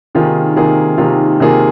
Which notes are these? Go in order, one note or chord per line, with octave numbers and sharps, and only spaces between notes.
C3 D#3 A#3 F4 G#4
C3 D#3 A#3 F4 G#4
C3 D#3 A#3 F4 G#4
C3 D#3 A#3 F4 G#4